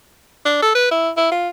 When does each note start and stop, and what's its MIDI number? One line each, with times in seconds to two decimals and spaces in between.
0.45 0.58 62
0.62 0.72 69
0.75 0.89 71
0.91 1.10 64
1.17 1.31 64
1.31 1.49 65